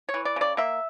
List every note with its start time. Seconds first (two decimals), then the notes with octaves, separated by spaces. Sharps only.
0.09 C#5
0.14 E3
0.25 D5
0.36 C#3 D5
0.57 A#3 E5